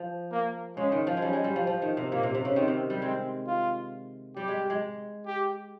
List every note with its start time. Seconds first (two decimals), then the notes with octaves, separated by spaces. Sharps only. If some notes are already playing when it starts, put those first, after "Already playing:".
Already playing: F3
0.31 A#3
0.76 C#3 G#3
0.92 D#3
1.07 F3
1.17 G#3
1.22 G3 C#4
1.33 G#3
1.44 G3
1.56 F3
1.67 F3
1.82 D#3
1.97 C3
2.12 A#2 A#3
2.23 C3
2.35 C3
2.45 C#3
2.56 D#3 C4
2.68 C3
2.90 G3
3.02 G#3 C4
3.47 F4
4.36 G3 G4
4.48 G#3
4.70 G#3
5.26 G4